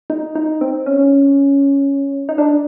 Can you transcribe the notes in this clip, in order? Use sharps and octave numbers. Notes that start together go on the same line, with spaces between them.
D#4
D#4
C4
C#4
D#4
D4